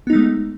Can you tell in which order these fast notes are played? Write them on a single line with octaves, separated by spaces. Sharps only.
B3 D#4 A3 G#3